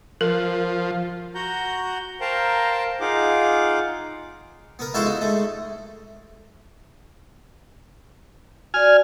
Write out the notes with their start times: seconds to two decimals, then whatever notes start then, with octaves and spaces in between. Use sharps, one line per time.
0.21 F3 A#4
1.35 F#4 F#5 A#5 G6
2.21 A#4 C5 F5 G5 A5 A#5
3.00 D#4 F4 G#4 F5 F#5 D6
4.79 B3 A#4
4.94 F3 G#3 E4 F#4 A4 C5
5.06 D#4
5.21 G#2 A3
8.74 F#4 D5 G#5 F6